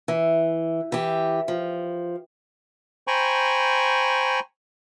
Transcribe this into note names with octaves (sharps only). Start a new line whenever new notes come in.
E3
E3 G4
F3
C5 G5 G#5 A#5 B5 C#6